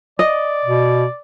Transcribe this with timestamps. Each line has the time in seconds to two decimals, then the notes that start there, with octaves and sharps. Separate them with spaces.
0.19 D5 D#5
0.65 B2